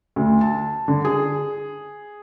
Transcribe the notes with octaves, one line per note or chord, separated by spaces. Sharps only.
D2
A5
D3
G#4